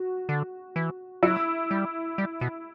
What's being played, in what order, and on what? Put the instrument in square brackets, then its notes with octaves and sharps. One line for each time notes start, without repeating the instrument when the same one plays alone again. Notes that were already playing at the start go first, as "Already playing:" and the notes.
Already playing: [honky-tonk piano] F#4
[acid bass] D3
E3
[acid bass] F#3 [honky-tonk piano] E4
[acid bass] G3
G3
B2